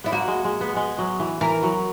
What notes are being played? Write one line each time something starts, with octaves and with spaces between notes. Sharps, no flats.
B3 E4
A#3 F#4
G#3
G#3
B3
G#3
F#3
E3
E3 A#4
F#3